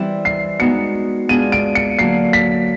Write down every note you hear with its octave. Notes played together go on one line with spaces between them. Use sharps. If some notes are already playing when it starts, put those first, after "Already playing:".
Already playing: E3 G3 C4 E4
C7
G#3 B3 D#4 F#4 C#7
G#3 B3 D4 F4 G#4 D#7
D7
C#7
D3 F#3 A#3 C7
B6